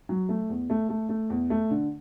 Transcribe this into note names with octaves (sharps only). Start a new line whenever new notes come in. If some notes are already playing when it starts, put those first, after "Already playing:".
F#3
A3
E2
A3
A3
A3
E2
A3
D3